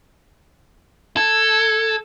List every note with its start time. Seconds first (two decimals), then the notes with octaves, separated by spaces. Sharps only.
1.17 A4 G#6